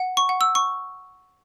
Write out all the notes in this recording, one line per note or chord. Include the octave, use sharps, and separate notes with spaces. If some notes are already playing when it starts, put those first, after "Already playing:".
Already playing: F#5
C#6
F#5
E6
C#6